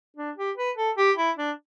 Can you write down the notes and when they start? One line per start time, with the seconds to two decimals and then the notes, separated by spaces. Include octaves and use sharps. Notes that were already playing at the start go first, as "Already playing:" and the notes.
0.17 D4
0.37 G4
0.57 B4
0.77 A4
0.98 G4
1.17 E4
1.37 D4